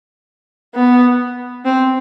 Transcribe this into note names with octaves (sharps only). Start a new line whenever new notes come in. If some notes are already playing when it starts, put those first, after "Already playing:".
B3
C4